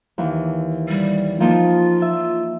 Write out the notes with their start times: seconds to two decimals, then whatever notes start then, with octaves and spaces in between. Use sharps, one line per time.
0.18 D#2 E3
0.89 G3
1.40 F3 A#3 D#4 F4
2.02 E5